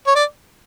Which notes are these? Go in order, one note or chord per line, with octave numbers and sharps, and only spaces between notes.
C#5
D5